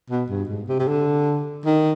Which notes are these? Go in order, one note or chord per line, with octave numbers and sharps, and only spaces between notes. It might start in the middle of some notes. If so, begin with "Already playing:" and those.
B2
G2
G#2
C3
C3
D3
D#3